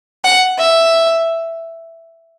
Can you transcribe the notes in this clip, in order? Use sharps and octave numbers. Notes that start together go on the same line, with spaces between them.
F#5
E5